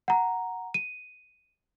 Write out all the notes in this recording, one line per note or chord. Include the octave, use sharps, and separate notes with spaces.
F#5 A#5
D#7